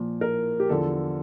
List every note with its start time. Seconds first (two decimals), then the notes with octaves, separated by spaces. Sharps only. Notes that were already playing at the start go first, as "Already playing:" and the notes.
Already playing: A#2 F3
0.21 A#4
0.60 G4
0.69 E2 D3 F3 A4